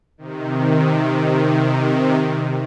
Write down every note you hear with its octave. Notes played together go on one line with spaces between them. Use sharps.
C3 D#3